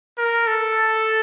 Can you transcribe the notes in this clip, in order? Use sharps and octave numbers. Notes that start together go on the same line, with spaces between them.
A#4
A4